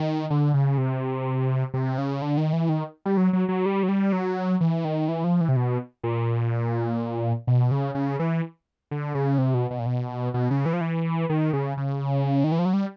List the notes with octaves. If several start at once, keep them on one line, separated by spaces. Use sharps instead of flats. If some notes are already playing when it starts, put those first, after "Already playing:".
Already playing: D#3
D3
C#3
C3
C3
C#3
D3
D#3
E3
D#3
G3
F#3
F#3
F#3
G3
F#3
G3
F#3
E3
D#3
E3
F3
E3
C3
B2
A#2
B2
C#3
C#3
E3
D3
C#3
C3
B2
B2
A#2
B2
B2
C#3
E3
F3
E3
D#3
C#3
C#3
D#3
E3
F3
F#3
G3